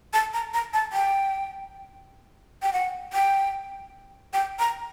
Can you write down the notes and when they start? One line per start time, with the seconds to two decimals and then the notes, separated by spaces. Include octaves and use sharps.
0.13 A5
0.34 A#5
0.54 A#5
0.73 A5
0.93 G5
2.62 G5
2.73 F#5
3.13 G5
4.33 G5
4.59 A#5